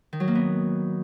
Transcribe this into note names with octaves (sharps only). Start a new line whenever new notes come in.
D#3
F#3
A#3
B3